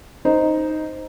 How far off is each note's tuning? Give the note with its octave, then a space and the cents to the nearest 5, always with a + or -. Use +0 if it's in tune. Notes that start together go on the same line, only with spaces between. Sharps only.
D#4 +0 C5 +0